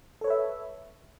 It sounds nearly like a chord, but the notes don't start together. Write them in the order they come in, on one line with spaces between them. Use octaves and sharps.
A4 C#5 B4 E5